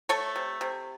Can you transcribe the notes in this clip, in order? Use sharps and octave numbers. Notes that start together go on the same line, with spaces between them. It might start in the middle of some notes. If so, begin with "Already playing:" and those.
A3 A4 C#5
C3
C3